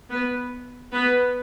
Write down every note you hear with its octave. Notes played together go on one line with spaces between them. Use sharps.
B3 B4
B3 B4